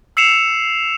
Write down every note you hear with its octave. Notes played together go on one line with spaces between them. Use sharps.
E6 C7 C#7 E7 F7